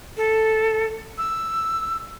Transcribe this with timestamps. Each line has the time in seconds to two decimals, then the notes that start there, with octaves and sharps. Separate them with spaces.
0.17 A4
1.18 E6